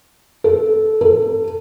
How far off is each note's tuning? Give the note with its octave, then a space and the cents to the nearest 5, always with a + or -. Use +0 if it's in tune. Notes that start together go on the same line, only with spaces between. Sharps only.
A4 -15
A4 +20